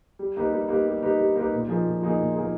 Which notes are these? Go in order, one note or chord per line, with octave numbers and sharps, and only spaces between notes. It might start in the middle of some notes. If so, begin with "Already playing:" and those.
G3
A#3 D#4 G4 B4
G3
A#3 D#4 G4 B4
G3
A#3 D#4 G4 B4
G3
A#3 D#4 G4 B4
A#2
F3 A#3 D#4 G#4
A#2
F3 A#3 D#4 G#4
A#2
F3 A#3 D#4 G#4